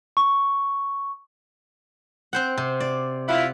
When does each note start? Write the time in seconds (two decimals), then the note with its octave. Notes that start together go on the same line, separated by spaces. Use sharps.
0.17 C#6
2.33 C4 C5 F#5
2.58 C3
2.80 D5
3.28 E4 F4 F#5